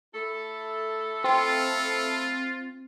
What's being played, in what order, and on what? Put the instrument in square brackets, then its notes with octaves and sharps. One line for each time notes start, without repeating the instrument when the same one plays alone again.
[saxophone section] A3 E4 A4
[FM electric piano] C4 [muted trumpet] F4